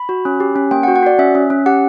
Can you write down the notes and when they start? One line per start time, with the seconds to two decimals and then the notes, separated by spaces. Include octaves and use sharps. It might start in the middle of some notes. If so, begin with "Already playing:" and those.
Already playing: B5
0.09 F#4
0.25 C#4
0.40 G4
0.56 C#4
0.71 A#3 G5
0.83 F#5
0.88 F#4
0.96 F#5
1.03 F#4 D5
1.18 C#4 E5
1.35 C#4
1.50 C#4
1.66 G4 F#5